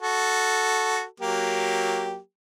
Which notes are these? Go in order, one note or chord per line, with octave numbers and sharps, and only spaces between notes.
F#4 A4
F#3 A#3 G4